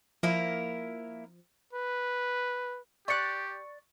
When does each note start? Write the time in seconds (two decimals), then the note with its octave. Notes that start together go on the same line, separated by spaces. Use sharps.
0.23 F3 A#3 E4 A#4
1.73 B4
3.08 G4 D5 C#6 F#6 C#7